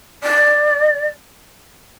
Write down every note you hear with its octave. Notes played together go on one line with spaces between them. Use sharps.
D5